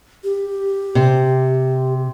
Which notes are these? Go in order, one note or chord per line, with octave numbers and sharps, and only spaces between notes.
G4
C3